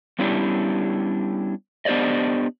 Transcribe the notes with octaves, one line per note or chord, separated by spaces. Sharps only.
G3 B3 C#4 D4 E4 G4
B3 D4 G4 C5 D5 D#5